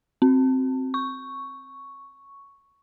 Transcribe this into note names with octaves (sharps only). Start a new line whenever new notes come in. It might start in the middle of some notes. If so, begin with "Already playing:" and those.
C4
C#6